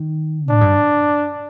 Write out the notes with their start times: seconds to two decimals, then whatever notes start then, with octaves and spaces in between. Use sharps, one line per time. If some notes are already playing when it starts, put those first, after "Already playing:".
Already playing: D#3
0.50 A2 D4
0.61 G2